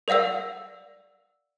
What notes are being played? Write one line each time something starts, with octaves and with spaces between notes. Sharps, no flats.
A#4 D5 F5 F#5 E6